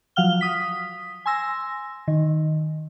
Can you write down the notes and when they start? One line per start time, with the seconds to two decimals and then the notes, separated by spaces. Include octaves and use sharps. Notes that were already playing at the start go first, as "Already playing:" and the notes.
0.16 F3 F#3 F5 F#5 F6 G7
0.41 D#6 B6
1.26 G#5 C6 E6 A#6
2.08 D#3